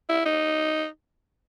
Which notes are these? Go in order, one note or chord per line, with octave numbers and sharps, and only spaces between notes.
E4
D#4